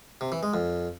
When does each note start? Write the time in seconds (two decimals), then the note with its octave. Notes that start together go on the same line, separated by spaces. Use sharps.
0.21 C3
0.32 E3
0.43 G#3
0.54 F2